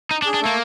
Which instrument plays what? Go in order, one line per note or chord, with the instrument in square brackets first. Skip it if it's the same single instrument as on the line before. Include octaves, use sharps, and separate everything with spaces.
[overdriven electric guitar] D#4
D4
[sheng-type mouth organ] G#4
[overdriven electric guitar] D4
[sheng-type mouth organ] A3 A4 [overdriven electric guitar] A#3